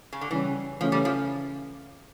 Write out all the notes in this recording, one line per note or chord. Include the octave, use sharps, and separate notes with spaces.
C#3
D3
C#3 E3 G3 C#4
C#3 E3 F3 A3 C#4
G3
F3